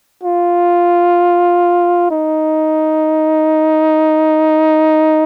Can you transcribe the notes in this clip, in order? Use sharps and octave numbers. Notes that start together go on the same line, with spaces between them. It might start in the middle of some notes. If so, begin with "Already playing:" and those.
F4
D#4